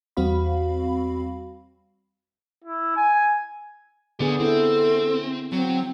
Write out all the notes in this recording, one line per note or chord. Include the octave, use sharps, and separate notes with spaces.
E2 G3 C4 F#4 F5 B5
E4
G#5
D3 B3 G#4 B4 D5
C4 E4 A4
F#3 C4